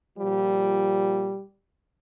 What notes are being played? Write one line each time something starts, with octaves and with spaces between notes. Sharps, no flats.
A#2 F3 G3